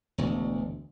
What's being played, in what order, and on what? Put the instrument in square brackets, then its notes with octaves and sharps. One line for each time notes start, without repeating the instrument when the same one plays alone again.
[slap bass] E1 D2